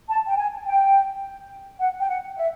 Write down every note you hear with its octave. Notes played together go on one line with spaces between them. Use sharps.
A5
G5
G#5
G5
F#5
G5
F#5
E5